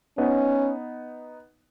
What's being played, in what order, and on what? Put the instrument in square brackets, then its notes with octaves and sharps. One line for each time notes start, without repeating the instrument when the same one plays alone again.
[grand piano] B3 D#4 [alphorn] C#4